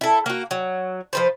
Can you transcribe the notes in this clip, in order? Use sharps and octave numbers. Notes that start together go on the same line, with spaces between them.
E4 A4
A#3 F#4
F#3
F3 B4 C5